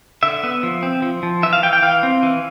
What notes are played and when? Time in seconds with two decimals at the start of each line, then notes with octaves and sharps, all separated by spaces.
0.23 D3 E5
0.43 B3
0.63 F3
0.83 C4
1.02 F3
1.23 F3
1.43 E3 E5
1.53 F5
1.63 E3 G5
1.73 G5
1.83 E3 F5
2.03 C4
2.23 E3